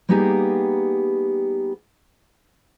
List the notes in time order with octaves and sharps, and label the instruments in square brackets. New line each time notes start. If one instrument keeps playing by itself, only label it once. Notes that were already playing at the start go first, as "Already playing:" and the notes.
[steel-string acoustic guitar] G3 A#3 B3 D#4 G4 G#4